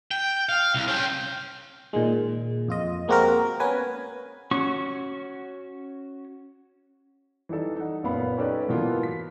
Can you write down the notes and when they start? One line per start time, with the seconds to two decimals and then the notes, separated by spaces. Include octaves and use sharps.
0.11 G5
0.49 F5
0.75 C2
0.88 C#4 G5
1.93 A#2 D#3 G#3
2.68 F2 F4 D#5
3.08 G#3 A#3 C4 F#4 G4 A#4
3.60 B3 C#4 B4 G#5
4.51 C#4 F#4 C#6
7.49 E3 G3 D#4 A4
7.76 D#4 F#5
8.03 F#1 A#2 B3 F5 B5
8.37 C#4 D#4 G4 A4 B4 D5
8.68 G#2 B2 E3 A#3 B3 F4
9.03 B6